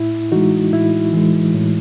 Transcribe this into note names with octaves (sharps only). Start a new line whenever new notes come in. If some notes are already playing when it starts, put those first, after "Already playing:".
Already playing: A2 E4
E3 G#3 D#4 F#4
A2 E4
E3 G#3
A2